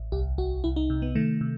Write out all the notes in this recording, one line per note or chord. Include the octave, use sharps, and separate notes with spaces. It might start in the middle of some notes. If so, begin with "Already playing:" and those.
Already playing: A1
C2 G4
C2 F#4
C2 E4
D#4
C3
B3
D#3 A3
C3